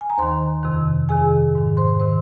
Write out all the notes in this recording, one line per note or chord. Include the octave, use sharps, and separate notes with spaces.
G#5
A#5
D#2 D#3 C5 C6
F2 C3 D#3
F2 C3 D#3 G#4 G#5
G#2 D#3
C5 C6
C3 D#3 C5 C6